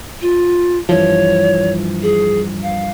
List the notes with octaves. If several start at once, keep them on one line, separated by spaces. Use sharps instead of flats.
F4
G2 E3 F3 C#5
G#4
F5